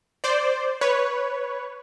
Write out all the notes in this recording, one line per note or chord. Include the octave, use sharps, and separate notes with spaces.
C5 D5
B4 C#5